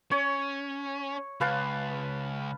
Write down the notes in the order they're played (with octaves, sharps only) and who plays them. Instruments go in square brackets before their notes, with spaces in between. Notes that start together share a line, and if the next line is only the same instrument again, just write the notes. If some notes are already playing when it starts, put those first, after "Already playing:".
[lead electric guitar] C#4 [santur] C#5
[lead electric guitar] C#2 [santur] B4 F5 A5